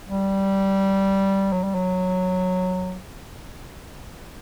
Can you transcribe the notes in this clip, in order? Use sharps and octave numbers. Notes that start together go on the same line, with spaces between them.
G3
F#3
G3
F#3